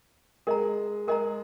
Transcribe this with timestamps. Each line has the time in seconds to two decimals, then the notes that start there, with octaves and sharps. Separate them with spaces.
0.47 G#3 G#4 A#4 D#5 A#5
1.07 G#3 G#4 A#4 D#5 A#5